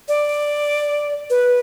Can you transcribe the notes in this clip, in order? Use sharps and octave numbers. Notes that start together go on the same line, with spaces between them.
D5
B4